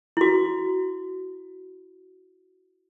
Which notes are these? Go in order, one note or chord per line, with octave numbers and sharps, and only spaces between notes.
E4 F#4